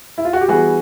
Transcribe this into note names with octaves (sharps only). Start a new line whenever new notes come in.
E4
F4
F#4
G4
E3 G3 B3 F#4 G#4